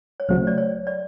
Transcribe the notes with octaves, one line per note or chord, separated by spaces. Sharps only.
C#5
C#2 C#3 F#3 A3 C5
D5
C#5
D5